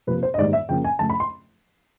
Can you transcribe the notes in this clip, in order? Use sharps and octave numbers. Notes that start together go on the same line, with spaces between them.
C3 F3 A#3 B4
C5
D#5
G#2 D#3 G3 A#3 D5
E5
C#3 F3 A#3 G5
G#5
C#3 F3 A3 A5
B5
C6